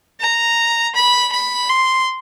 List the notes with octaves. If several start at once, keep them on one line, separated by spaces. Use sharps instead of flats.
A#5
B5
B5
C6